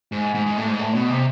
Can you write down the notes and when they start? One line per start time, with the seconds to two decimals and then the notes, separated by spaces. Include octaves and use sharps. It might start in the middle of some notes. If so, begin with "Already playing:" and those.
0.12 G#2
0.35 G#2
0.46 G#2
0.57 A2
0.68 G#2
0.79 A2
0.94 B2
1.10 C3